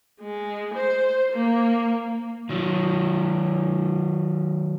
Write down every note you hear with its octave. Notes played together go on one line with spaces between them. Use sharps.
G#3
C5
A#3
D#3 F#3